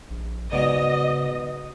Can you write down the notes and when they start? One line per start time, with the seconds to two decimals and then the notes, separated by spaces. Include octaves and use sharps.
0.11 A#1
0.53 G#2 C#3 F#3 B3 D#4 D5 D#5